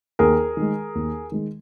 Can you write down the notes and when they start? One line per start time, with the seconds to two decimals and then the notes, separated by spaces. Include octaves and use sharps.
0.19 D#2 G#4 A#4
0.57 D#3 G#3
0.95 D#2
1.32 D#3 G#3